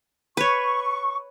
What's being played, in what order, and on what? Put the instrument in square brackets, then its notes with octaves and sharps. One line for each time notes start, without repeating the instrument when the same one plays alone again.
[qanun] B4 C#5 [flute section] C#6